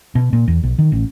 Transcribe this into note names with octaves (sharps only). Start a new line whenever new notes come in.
B2
A#2
E2
B1
D#3
A1